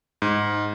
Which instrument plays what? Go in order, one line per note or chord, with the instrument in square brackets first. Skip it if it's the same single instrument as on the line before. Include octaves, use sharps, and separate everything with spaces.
[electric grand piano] G#2